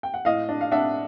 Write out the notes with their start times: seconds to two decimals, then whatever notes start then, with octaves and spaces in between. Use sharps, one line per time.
0.03 G5
0.14 F#5
0.25 A2 D#5 F5
0.49 D4
0.61 F5
0.71 D4 E5 F#5